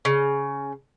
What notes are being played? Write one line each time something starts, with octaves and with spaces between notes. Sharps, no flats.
C#3